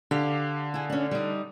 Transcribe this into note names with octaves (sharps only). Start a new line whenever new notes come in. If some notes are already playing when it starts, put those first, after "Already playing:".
D3 G4 F5
E4 G#4
C#4 D4
G3 D#4